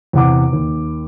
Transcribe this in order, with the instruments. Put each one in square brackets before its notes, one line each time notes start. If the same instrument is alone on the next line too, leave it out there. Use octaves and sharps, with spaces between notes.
[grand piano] E2 C3 F#5 D6
D#2